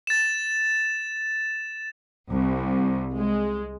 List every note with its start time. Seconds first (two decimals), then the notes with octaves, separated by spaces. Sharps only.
0.07 A6 E7
2.28 C2
3.16 G#3